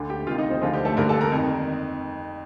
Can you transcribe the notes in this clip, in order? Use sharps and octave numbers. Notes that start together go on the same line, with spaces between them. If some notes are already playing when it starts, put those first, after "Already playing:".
Already playing: D2 D3
G4 G5
D2 C3 D#3 F4 F5
D#4 D#5
C4 C5
D2 D3 F3 F4
G3 G4
A3 A4
G2 D3 A#3 A#4
A4 A5
A#4 A#5
F2 D#3